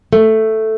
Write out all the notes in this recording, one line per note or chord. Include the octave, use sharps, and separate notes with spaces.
A3